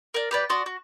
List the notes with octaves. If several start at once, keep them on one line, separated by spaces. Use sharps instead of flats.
A#4 D5
G4 B4 D5
F#4 D5 C6 D#6
F#4